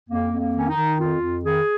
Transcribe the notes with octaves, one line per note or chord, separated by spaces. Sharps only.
F2 A#3
F2
A#3
D#3 C#4
D#4
D#3
F2 F4
F2
D#3 G#4